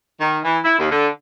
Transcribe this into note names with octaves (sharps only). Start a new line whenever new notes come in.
D#3
E3
E4
D#2
D3